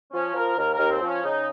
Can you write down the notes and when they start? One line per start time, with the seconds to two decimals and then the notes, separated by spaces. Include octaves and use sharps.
0.13 F3 C#4
0.35 F3 A#4
0.58 D#2 A#4
0.74 D#2 A#4
0.90 C4
1.01 F3
1.07 C#4
1.23 C#3 D#4